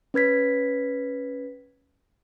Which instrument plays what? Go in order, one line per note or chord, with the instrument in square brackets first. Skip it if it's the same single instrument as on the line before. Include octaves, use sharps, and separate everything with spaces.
[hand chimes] C#4 B4 G#6 B6